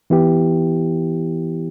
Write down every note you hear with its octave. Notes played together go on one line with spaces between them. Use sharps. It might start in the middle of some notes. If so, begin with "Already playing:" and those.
E3 B3 E4 G4